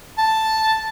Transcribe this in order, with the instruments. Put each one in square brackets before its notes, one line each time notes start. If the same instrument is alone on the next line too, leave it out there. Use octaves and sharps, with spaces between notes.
[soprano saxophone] A5